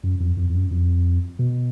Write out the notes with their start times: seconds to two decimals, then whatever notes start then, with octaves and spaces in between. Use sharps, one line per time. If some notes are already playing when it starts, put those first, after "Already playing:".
0.03 F#2
0.20 F2
0.37 F2
0.50 F2
0.54 F#2
0.71 F2
1.39 B2